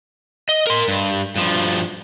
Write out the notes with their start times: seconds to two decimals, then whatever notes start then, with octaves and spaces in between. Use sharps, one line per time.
0.49 D#5
0.67 A#4 C6
0.88 G2
1.36 G2 F3